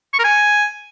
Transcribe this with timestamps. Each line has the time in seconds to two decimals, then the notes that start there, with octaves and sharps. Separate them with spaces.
0.13 C#6
0.19 A#4
0.24 G#5